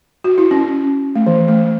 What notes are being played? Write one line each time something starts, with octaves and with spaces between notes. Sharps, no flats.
F#4
E4
C#4
A3
E3
A3